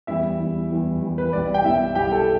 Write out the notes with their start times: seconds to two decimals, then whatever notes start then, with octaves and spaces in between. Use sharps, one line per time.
0.07 E2 E3 G3 E4 E5
0.39 E2 E3 G3
0.71 E2 E3 G3
1.02 E2 E3 G3
1.18 B4
1.33 B1 B2 G3 D5
1.54 G5
1.64 B1 B2 G3 E4 E5
1.95 B1 B2 G3 G4 G5
2.12 A4 A5